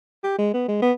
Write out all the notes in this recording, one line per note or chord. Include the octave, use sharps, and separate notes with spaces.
G4
G#3
B3
G#3
B3